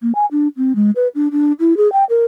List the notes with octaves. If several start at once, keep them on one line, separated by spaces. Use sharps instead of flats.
A#3
G#5
D4
C4
G#3
B4
D4
D4
E4
G#4
G5
A#4